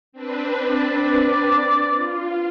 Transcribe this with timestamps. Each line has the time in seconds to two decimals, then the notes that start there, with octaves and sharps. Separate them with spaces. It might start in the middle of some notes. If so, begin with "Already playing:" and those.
0.12 C4 D4 B4
0.70 D5
1.95 F4